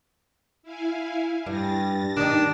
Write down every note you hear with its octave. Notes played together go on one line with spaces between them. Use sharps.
E4 F5 G#5
G2 A6 A#6
D#3 D4 D#4